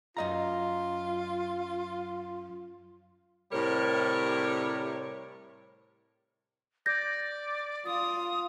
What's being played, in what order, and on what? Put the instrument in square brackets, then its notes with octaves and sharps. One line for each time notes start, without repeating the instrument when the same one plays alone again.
[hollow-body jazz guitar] F#2 D#5 A#5 [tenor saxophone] F4
[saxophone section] A2 C3 G3 A#4 C#5
[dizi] D5 [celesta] G6 A#6
[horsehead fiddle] F4 F5 [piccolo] D#6